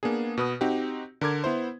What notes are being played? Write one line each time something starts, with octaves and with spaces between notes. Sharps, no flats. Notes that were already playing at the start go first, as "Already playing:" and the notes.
A#3 B3 D4 G#4
B2 B4 D#6
C4 D#4 F#4 G4
D3 A#4 D6 G#6
B3 E4 C5